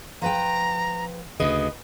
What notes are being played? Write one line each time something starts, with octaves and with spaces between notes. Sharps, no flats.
F3 B4 G5 A#5
D2 C#3 B4 D#5 D#6